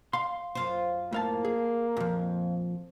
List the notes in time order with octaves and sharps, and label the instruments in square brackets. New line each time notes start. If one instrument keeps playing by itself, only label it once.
[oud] F5 [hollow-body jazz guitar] C6
[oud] F#2 F4 C5
[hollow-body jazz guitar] A2 F5 A5 [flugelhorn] A#3
[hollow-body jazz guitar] G#4
[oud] F2 [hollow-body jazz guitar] A#2 F3